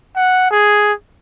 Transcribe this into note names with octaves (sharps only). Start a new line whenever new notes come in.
F#5
G#4